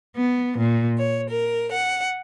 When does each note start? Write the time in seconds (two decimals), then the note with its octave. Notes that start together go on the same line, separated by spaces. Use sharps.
0.17 B3
0.57 A#2
0.98 C#5
1.30 A#4
1.72 F#5